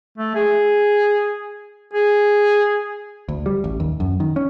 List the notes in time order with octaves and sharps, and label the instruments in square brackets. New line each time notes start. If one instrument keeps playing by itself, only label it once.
[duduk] A3
G#4
G#4
[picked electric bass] D2
G3
A1
D#2
F#2
D#3
C#4